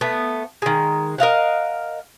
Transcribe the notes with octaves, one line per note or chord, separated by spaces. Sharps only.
A3 B3
D#3 G#3
A#4 D#5 F5 F#5